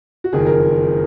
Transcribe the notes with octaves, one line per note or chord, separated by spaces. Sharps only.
F#4
F#1 F2 D#3 G#4
A#4